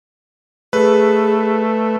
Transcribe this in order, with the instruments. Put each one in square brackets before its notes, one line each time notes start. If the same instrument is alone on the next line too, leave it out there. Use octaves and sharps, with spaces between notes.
[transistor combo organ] A3 [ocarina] G#4 [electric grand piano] B4